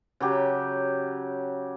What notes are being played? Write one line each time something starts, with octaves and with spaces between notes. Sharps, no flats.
C#3 F#3 G4